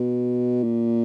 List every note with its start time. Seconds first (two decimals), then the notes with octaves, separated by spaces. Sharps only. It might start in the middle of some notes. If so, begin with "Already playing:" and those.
Already playing: B2
0.63 A#2